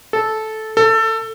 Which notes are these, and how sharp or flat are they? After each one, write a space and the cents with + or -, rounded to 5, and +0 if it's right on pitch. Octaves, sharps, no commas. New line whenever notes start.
A4 -10
A4 +20